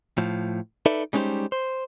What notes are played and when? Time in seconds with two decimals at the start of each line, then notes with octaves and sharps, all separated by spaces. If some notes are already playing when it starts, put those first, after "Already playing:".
0.18 A2 F3
0.86 D#4 A4 B4 D5 E5
1.13 G3 G#3 C#4 D#4 G4 C5
1.52 C5